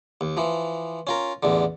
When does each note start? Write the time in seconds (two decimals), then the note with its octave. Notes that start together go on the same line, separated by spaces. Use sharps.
0.21 D#2
0.37 E3 F3
1.07 C#4 F4 A#4
1.43 A1 E2 D3